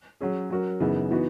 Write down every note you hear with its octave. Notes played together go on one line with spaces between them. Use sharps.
F#3 C#4 G#4
F#3 C#4 F#4 A#4
F#2 C#3 E3 B3 D#4
E3 B3 D#4 F#4